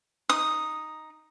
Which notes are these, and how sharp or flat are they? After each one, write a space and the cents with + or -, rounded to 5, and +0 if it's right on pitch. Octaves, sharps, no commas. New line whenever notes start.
D#4 +0 D#6 +0